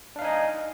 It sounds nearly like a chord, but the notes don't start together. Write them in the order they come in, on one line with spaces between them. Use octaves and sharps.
D4 F5 D#4 G#5 D#5